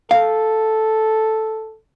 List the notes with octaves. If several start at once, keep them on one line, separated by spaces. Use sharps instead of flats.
A4 F5